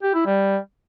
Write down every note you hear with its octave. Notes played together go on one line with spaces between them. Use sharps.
G4
E4
G3